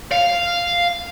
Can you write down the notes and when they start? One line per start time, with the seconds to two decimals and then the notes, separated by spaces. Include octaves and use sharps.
0.12 F5